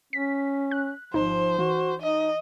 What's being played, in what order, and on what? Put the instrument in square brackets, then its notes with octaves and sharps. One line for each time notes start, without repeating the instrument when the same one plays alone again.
[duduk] C#4 [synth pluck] B6
[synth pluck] F#6
[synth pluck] G#1 D#4 [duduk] F3 [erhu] C5
[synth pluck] E3 [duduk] F#4
[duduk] D#4 [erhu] D#5